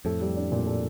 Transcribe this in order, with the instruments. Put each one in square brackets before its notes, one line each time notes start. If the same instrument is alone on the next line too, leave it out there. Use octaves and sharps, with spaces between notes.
[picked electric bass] F2 A2 [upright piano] A4
[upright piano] G3
D4
A#2
A4